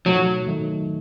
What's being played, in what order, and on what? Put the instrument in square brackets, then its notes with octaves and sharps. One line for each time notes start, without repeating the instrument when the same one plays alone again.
[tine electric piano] B2 A3 D#4 [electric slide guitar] F#3
[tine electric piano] D#3 F#3 A3 D#4